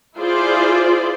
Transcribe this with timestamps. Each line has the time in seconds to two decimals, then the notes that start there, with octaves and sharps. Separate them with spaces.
0.16 E4 F4 G#4 C5 D5